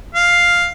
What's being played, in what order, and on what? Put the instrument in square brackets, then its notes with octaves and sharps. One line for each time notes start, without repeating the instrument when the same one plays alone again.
[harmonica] F5